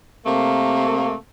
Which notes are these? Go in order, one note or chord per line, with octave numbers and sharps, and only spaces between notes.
C3 A3 A#3